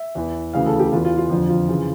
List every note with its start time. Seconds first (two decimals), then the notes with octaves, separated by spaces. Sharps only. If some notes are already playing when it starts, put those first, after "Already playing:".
Already playing: E5
0.15 E2 E3
0.53 D2 C#3 E3 F5
0.66 A4
0.79 G4
0.92 E2 E3 F4
1.05 F4
1.17 F4
1.30 F2 D3 F3
1.49 F4
1.68 C#3 E3 F4